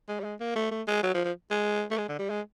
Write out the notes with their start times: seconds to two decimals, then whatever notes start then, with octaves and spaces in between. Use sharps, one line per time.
0.08 G#3
0.20 G3
0.24 G#3
0.40 A#3
0.55 A3
0.71 A3
0.87 G#3
1.03 F#3
1.14 F3
1.25 F3
1.51 G#3
1.91 A3
1.98 G#3
2.09 D3
2.19 G3
2.30 G#3